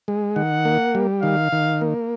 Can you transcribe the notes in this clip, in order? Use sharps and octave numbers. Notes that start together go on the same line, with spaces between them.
G#3
D#3 F#5
A#3
G3
D#3 F5
D#3
A#3